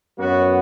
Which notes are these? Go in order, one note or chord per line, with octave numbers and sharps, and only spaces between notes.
F#2 F#3 B3 F#4